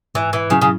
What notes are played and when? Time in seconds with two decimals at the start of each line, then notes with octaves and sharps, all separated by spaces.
0.15 G#2 E3
0.33 E3
0.50 C#3 F#3 C#4 E4
0.61 C#3